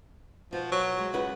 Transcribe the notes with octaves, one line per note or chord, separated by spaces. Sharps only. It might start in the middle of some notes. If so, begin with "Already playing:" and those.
B2 F3 F#4
F#3
G#3
C#2 F4 B4 F#5